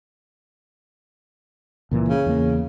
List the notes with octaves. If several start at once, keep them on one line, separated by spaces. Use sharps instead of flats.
C#2 A#2 E3
C#3
E2 A#3